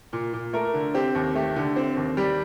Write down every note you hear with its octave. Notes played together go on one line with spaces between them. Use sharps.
A#2
A#2
A3 A#4
D3
C4 G4
D#2
A3 G4
D3
C4
D#2
G3 G4